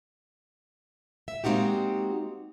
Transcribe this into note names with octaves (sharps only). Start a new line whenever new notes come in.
E5
G#3 A#3 C4 D#4 F#4 G4